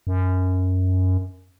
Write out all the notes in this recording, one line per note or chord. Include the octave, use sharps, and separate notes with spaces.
F#2